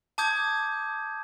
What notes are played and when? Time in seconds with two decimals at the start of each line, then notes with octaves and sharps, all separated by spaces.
0.18 A5 D6 D#6 G6 G#6